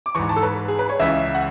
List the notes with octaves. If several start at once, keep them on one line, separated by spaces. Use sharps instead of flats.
D6
G#2 E3 C#6
A5
A4
B4
G#4
B4
C#5
C#2 C#3 E3 E5
F#5